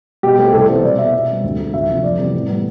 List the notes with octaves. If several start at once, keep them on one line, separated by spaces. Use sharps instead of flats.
B2 G4
A3 C4
C2 A4
C3 E3 B3 C5
B2 D5
B3 E5
B2
G3 C4
D2
D3 A3
D2 E5
C3 F3
F2 D5
C3 E3 G3 B3
A2
E3 G3 B3